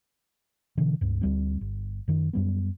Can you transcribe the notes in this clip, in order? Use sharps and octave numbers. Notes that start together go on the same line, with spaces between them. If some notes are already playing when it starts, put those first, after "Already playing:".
B2 D3 E3
C#2 G2
D2 G3 C4
G1
F#2 D#3
F#2 G3 B3